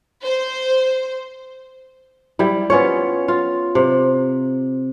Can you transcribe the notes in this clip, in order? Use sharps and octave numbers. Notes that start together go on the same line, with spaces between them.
C5
G3 E4
B3 C#4 F4 C#5
F4
C3